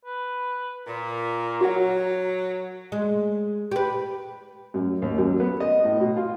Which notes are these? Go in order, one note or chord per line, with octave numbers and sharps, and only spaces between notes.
B4
A#2 A#4
F#3 F#4 F#5
G#3
G4 B4
F#2
D#2
F#2
B3
D#5
A2
B2
F4